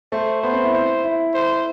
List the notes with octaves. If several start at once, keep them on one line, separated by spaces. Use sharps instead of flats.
A3 C5
B3 C5
C4
E4
C5
E4
C5